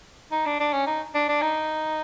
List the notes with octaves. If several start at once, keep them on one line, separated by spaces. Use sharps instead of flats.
D#4
D4
D4
C#4
D#4
D4
D4
D#4